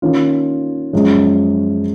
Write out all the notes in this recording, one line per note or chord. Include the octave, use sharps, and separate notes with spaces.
D#3 A#3 C#4 F4
F#2 F3 G#3 C#4